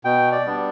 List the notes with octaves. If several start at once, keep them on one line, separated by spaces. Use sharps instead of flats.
B2 G5
D5
G3 B3 D4